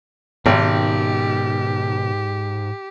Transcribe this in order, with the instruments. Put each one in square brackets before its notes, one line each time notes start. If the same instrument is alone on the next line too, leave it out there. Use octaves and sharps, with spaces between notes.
[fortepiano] G#1 [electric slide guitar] G#2 [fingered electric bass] B2 D#3 [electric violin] G4